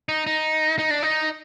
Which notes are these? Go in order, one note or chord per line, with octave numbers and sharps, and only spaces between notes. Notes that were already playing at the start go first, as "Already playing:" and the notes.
D#4
D#4
D#4
D4
D#4